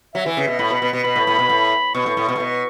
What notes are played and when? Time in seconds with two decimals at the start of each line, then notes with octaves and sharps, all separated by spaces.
0.15 F#3 E5
0.26 E3
0.37 C#3
0.48 B2
0.59 A2 B5
0.70 B2
0.75 B5
0.82 B2
0.93 B2
1.04 B2 B5
1.16 A2
1.27 A2
1.39 B2
1.49 A2
1.95 B2 C#6
2.06 A2
2.17 A2
2.29 B2
2.36 A2
2.40 B2